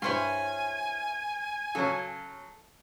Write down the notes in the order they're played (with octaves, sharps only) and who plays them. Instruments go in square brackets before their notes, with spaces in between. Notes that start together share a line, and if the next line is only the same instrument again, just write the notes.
[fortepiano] G2 C5 [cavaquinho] E4 C#5 C6 [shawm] G#5
[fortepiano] C#3 F#3 C#4 [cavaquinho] A4